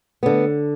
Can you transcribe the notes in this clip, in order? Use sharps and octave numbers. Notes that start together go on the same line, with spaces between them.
D3 B3